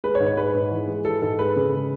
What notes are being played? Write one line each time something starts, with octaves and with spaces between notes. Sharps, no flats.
G#3 B4
C#5
G#2
C#5
G#3 B4
G#2
E3
G#3
E3 A4
G#2 A4
G#3 B4
C#3
G#3